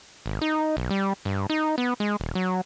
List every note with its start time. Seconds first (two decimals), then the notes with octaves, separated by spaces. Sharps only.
0.26 G#1
0.41 D#4
0.77 B1
0.90 G3
1.25 G2
1.50 D#4
1.78 B3
2.00 G#3
2.20 D#1
2.35 F#3